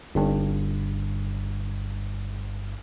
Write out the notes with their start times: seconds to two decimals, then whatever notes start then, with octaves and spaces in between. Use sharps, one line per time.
0.15 G1 G2